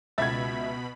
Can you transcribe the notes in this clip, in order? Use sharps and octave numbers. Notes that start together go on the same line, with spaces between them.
C#2 B2 E5 B5 G#6 A6